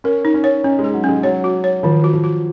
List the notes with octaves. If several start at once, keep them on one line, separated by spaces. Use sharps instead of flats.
C#4 A#4
D#4
C#4
C#5
C#4 D#4
G#3
G#4
F#3
G#3 C#4
F#3 C#5
F#4
C#5
D#3 F3
F#4
F3
F#4